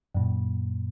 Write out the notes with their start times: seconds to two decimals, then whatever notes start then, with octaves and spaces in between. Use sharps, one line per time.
0.15 F#2 A#2